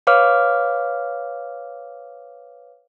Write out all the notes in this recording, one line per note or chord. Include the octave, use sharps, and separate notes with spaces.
B4 C#5 F5 D6 F6